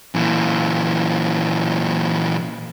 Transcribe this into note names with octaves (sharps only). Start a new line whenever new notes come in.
A#2 E3